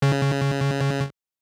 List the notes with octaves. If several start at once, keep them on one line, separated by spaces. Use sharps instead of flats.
C#3